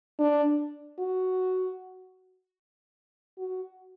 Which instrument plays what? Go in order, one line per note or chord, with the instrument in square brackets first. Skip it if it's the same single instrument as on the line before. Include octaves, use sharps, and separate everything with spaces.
[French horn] D4
F#4
F#4